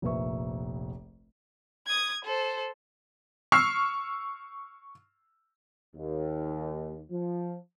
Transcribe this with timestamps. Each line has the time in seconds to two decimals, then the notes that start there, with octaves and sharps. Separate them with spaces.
0.02 F1 A#1 A#3 B4 E5 C#6
1.87 D#6 G#6
2.25 A4 C5
3.52 C#6 E6 F6 C7
5.96 D#2
7.10 F3